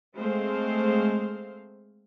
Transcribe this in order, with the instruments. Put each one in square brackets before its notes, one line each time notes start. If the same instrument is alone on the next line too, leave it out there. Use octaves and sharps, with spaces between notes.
[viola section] G#3 A3 C4 C5 F5